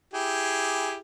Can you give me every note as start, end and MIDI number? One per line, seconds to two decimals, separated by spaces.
0.14 0.96 64
0.14 0.96 67
0.14 0.96 68